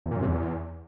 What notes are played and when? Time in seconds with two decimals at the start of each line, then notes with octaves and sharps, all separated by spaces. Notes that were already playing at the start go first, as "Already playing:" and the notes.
0.06 E2
0.11 A#2
0.16 F#2
0.22 C3
0.27 E2